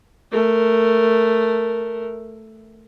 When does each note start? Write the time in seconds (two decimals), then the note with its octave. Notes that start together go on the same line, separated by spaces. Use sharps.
0.32 A3 A#4